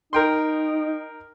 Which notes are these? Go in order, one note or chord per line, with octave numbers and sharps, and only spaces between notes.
D#4 A#4 G5 C6